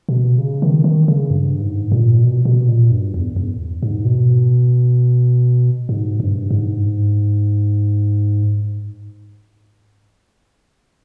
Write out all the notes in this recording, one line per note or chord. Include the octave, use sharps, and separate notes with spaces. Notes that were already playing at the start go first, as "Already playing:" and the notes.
B2
C#3
D#3
D#3
C#3
G2
G#2
A#2
B2
B2
A#2
G2
E2
E2
G#2
B2
G#2
G2
G#2